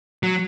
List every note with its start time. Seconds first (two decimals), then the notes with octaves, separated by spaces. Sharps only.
0.23 F#3